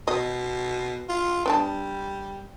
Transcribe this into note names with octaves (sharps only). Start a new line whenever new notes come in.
B2 D#5
F4
G3 B3 D4 A5